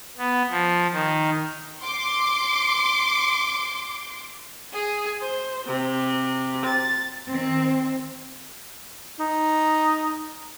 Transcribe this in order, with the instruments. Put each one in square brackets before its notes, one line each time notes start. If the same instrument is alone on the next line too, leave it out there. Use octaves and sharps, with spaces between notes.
[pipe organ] B3
F3
D#3
[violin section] C6 D6
[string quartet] G#4
C5
C3
A6
[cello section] D#3 C4
[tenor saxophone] D#4